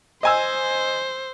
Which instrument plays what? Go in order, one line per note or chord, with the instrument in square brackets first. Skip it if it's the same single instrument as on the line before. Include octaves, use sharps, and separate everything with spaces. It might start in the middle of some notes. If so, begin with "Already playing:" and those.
[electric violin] C5 [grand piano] D#5 G#5 E6